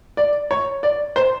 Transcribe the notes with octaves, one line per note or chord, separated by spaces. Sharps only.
D5
C#5
D5
C5